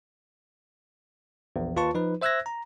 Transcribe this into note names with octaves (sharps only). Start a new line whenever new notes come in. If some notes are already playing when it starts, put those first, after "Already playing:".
A#1 E2
D#2 F4 B4 A5 C#6
F3 D#4 B4
C5 E5 E6 F#6 G#6 A#6
A#5